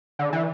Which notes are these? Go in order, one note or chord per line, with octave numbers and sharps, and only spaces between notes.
D3
E3